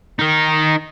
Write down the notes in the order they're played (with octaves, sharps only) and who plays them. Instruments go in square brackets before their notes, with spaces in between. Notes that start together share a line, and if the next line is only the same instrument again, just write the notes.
[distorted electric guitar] D#4 A#4